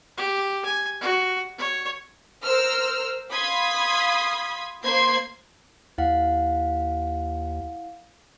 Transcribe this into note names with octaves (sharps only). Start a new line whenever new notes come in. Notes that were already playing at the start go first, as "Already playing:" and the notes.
G4
G#5
F#4
C#5
A#4 C5 E6 F6
F5 B5 C6 D#6 G#6 B6
A#3 C5 B5 C6 G#6 C7
D#2 E4 F5 F#5